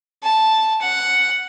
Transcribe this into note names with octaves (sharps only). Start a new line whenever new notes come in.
A5
F#5